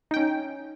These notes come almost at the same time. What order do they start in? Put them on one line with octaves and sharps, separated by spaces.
D#4 G5 C#4